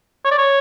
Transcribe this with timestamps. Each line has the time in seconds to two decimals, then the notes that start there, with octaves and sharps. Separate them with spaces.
0.25 C#5
0.31 D5
0.38 C#5